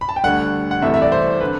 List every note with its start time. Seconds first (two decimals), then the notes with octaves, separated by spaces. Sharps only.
0.01 B5
0.09 A5
0.16 G5
0.23 D2 D3 G3 F#5
0.71 F#5
0.82 C2 C3 E3 A3 E5
0.94 E5
1.02 D5
1.12 C5
1.41 D3 B4